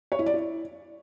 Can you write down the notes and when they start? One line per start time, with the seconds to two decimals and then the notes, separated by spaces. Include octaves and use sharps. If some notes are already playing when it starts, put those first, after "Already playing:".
0.12 C#5
0.19 E4
0.26 D5
0.34 E4